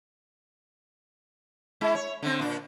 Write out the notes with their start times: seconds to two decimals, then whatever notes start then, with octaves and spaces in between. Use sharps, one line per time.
1.81 G#3 E4
1.95 C#5
2.23 D3 C4
2.39 A#2 D4